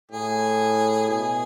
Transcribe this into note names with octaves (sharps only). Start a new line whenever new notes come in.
A2 G#4
B2 G#4